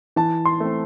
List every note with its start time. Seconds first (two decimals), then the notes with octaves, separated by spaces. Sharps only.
0.16 E3 A5
0.45 C6
0.60 A3 C4